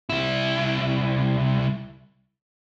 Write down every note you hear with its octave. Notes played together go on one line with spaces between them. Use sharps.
C2 E4